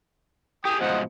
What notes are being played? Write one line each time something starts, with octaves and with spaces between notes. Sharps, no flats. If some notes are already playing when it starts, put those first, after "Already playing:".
G4 G#4 G5 D#6
G#2 B2 F3 C5 D#5 F#5